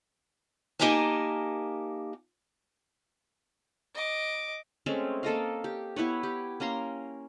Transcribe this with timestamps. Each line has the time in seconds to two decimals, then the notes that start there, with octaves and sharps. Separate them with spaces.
0.79 A#3 D#4 G4 A#4 G#5 A5
3.95 D#5 D6
4.86 G#3 A3 C4 C#4
5.23 A#3 A4 D#5 F5
5.64 G4
5.96 B3 E4 B4 C#5
6.23 G4
6.60 A#3 C#4 A#5 C6